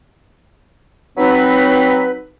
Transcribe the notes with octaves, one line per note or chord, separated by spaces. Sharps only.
F#3 C4 D#4 B4